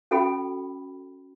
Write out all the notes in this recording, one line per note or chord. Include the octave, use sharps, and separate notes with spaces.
C#4 F#4 A4 G5 B5